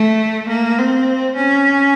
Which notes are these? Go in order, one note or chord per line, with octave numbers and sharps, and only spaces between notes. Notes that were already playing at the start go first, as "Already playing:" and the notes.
Already playing: A3
A#3
C4
C#4